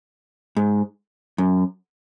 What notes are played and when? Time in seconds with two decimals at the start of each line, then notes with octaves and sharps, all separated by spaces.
0.56 G#2
1.38 F#2